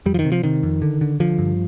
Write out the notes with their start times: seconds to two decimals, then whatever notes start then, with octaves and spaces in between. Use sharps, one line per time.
0.06 F2 G3
0.14 F3
0.19 D#3
0.25 C3
0.32 F3
0.43 C3 D#3
0.63 F2
0.82 D3
1.01 D3
1.20 D3 F3
1.39 G2